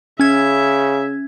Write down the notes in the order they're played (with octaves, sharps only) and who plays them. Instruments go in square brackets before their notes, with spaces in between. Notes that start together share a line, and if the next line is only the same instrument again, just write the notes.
[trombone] C#3 [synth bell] C#4 G#6 [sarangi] E5